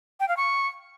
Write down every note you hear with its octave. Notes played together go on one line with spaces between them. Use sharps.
G5
F5
C#6